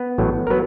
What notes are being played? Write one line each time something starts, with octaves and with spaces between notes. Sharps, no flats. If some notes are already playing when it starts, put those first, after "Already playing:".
Already playing: B3 B4
A1 A2 F#3
A#4
F#3 B3 B4